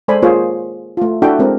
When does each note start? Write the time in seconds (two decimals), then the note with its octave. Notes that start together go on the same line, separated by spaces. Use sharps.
0.08 G#3 A4 C5 D5 G#5 B5
0.22 A#3 F4 G#4 C5 C#5
0.97 A3 F4
1.22 D4 E4 F#4 A4 E5 G5
1.39 G#3 C4 A#4